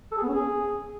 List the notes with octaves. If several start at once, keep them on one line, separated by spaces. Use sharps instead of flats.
A4
G#4
B3
C#4
G#4